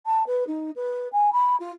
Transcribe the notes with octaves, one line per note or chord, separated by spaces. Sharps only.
A5
B4
D#4
B4
G#5
B5
F4